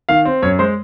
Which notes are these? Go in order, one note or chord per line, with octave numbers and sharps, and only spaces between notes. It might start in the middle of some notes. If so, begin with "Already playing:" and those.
D#3 F5
C4
F#2 C#5
G#3 C5